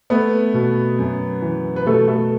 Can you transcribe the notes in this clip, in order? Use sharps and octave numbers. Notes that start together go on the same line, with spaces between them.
A3 B3 B4
B2
F#2
E3
B4
B2 A3 A4
A3 A4